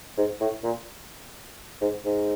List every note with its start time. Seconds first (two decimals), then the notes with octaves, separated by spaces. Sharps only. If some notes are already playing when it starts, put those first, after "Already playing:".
0.17 G#2
0.41 A2
0.64 A#2
1.81 G#2
2.05 G#2